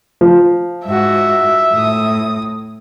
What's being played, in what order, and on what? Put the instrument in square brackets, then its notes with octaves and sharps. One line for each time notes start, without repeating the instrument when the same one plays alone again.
[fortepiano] F3
[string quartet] G#2 F#4 [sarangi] E5
[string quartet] A2 D#6